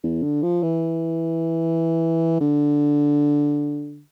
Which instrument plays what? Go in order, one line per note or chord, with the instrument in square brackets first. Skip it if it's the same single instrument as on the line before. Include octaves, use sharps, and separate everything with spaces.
[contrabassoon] E2
D3
F3
E3
D3